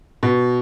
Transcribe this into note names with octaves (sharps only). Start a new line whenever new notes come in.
B2